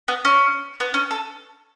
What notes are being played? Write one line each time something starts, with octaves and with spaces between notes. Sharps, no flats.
B3
C#4
B3
C#4
A4